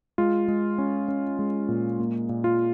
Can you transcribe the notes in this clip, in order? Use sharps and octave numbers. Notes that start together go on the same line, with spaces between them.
G#3 F4
G#3
C#4
C#4
G#3
A#2
A#3
A#2
F4